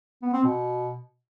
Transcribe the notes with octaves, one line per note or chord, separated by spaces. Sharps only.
B3
C4
B2